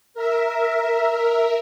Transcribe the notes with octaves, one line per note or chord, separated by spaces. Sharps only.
A#4 E5